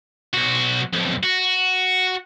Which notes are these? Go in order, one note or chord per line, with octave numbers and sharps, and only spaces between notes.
B1 F#4
B1 F2
F#4